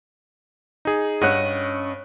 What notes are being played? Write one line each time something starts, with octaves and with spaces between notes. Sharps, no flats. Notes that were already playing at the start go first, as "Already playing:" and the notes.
D#4 G#4
G2 C#4 D#5 F#5 F#6